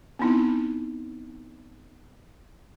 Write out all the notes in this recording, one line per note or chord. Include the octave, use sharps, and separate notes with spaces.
B3 C4 D#4 E4